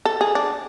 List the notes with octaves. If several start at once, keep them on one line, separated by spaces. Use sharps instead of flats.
A4
G#4
D4